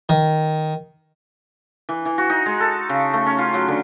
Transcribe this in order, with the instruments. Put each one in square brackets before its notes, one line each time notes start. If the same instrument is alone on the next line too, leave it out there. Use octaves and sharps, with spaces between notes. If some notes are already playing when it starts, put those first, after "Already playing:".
[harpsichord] D#3
[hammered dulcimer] E3
E3
F#4
D#4
G#3
A4
C#3
A3
C#4
F4
F#3
D3